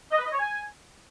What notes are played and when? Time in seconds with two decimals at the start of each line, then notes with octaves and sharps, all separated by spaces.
0.11 D#5
0.18 B4
0.25 D#5
0.32 C#5
0.39 G#5